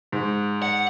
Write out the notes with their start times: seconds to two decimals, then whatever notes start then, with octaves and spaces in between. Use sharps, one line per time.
0.12 G#2
0.62 F#5